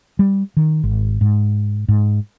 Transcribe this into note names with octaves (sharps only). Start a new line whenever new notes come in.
G3
D#3
G#1
G#2
G#2